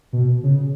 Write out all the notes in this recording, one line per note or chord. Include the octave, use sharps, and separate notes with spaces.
B2
C#3